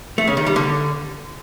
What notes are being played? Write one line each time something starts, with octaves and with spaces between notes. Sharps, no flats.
A3
C#3
D#3
G3
D3